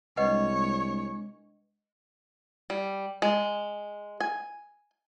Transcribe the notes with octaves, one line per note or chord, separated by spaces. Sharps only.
C2 G#3 D4 B4 C#5 D#5 F#5
G3
G#3
G#5